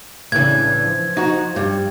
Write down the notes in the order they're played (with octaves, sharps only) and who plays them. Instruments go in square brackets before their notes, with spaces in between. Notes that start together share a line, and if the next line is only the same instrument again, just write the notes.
[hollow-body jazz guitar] A2 E3 [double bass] C#3 D4 [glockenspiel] G#6
[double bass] F3
[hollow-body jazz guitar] D#4 F#4
G2